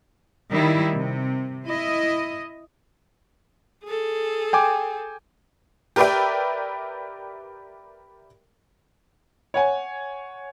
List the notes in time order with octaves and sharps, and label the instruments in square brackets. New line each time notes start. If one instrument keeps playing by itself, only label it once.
[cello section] D#3 G3 E4
C3
E4 D#5
[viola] G#4 A4
[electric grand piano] G5 G#5 D6
[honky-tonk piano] G4 A#4 B4 D5 E5 G5
[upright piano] C#5 F#5 G#5